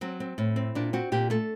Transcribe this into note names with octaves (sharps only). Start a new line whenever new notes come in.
F#3 C4
C4
A2
C4
A#2 D4
C4 F#4
A#2 G4
A3 A4